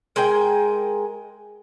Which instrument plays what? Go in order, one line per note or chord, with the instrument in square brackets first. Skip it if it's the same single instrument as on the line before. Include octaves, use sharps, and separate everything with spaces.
[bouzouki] G#3 A#4 G5 G#5